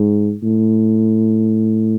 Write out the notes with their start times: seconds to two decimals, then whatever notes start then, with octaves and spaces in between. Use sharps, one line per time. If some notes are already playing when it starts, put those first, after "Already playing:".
Already playing: G#2
0.43 A2